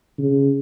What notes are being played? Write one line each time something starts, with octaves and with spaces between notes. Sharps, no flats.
C#3